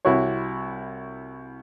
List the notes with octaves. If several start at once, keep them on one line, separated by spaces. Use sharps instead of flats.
C2 E4 F#4 C#5